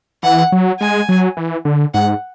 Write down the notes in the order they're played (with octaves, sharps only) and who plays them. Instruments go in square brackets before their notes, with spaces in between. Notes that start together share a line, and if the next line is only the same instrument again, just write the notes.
[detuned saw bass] E3 [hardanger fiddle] F#5
[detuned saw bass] F#3
[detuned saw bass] G#3 [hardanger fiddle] G#5
[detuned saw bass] F#3
E3
D3
[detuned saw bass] G#2 [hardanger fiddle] F#5